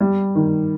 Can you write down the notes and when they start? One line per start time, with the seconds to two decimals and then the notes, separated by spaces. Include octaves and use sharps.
0.01 G3
0.35 D#3